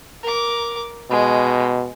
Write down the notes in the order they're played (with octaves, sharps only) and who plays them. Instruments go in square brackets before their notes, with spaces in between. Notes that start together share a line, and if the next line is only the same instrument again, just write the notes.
[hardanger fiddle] A#4 D6
[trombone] B2 [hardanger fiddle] G#3